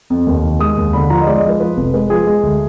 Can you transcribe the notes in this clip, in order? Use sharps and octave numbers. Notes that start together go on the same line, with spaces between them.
F2
D#2
D#3
G#3 D#6
D#2
D3 B5
F3 A#5
D#5
G#3 D5
D#5
F3
B4
F3 B4
F1
G#3 B4
F3 G#4
G#3
D2